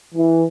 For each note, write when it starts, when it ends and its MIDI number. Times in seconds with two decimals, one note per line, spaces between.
0.15 0.44 52